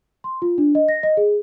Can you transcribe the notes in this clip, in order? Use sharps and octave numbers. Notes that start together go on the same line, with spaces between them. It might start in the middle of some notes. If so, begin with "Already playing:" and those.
C6
F4
D4
D#5
A#6
D#5
G#4